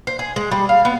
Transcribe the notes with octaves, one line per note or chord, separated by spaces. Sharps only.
C5
G#4
G#3
G3
F5
B3